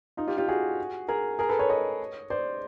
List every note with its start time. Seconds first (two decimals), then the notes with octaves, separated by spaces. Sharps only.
0.17 D#4 F4
0.27 F4 G4
0.38 F4 G4
0.48 F#4 G#4
1.08 G#4 A#4
1.39 G#4 A#4
1.49 A4 B4
1.59 B4 C#5
1.69 C#5 D#5
2.30 C5 D5